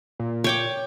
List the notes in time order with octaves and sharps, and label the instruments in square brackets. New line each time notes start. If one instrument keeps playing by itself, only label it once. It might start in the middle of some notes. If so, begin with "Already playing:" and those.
[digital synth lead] A#2
[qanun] C#5 G5 D6